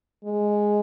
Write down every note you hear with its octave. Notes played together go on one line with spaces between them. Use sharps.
G#3